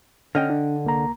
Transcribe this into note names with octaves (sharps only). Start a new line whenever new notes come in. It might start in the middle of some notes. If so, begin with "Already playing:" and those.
D3 C#4 D#5 G5 F6
D4
C2 A#3 A#5